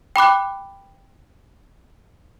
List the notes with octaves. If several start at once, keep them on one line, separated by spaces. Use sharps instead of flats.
G5 B5 D6 F#6